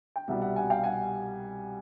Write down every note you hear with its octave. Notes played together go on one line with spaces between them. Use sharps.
G5
C2 B2 G3 E5 F#5
E5 F#5
F#5 G#5
F5 G5
F#5 G#5